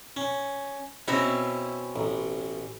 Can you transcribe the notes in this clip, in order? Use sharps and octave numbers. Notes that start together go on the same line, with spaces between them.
C#4
B2 C4 C#4 E4
A1